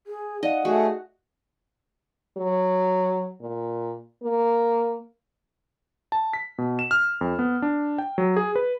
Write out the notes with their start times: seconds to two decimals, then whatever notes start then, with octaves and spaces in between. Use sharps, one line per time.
0.07 G#4
0.43 D#4 D5 D#5 F5 F#5
0.65 A3 F#4 G#4
2.37 F#3
3.41 A#2
4.23 A#3
6.12 A5
6.33 B6
6.58 B2
6.79 E7
6.91 F6
7.21 F2
7.39 B3
7.62 D4
7.98 G5
8.18 F#3
8.37 G#4
8.56 B4